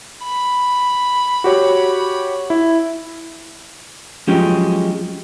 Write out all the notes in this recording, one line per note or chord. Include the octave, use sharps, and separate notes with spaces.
B5
F#4 G4 C#5
E4
F3 F#3 G#3 C#4 G4